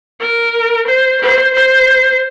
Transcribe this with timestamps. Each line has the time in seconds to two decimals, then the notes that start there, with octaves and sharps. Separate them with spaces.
0.20 A#4
0.87 C5
1.21 C5
1.53 C5